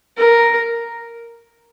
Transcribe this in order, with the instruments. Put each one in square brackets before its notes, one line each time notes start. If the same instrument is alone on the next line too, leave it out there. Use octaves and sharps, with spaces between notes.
[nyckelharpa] A#4